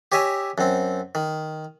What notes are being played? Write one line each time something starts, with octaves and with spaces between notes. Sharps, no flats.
G4 C#5 D#5 E5 G#5
F#2 C4
D#3